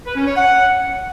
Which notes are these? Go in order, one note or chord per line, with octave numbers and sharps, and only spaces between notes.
B4
C#4
C#5
F#5